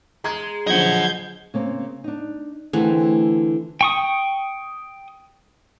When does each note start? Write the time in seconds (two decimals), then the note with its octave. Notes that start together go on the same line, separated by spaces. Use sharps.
0.24 G#3 A#5 G#6
0.67 D3 F3 F#3 D#5 F#5 G6 G#6
1.54 C#3 A#3 C4
2.04 D4 D#4
2.73 D3 E3 A3 C4 G#4
3.81 G5 C#6 D#6